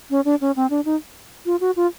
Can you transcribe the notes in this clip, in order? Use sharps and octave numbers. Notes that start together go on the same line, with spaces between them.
C#4
D4
C#4
C4
D4
D#4
F4
F#4
F4